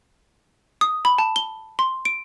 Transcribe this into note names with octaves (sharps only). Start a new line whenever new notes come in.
D#6
B5
A5
G7
C6
D7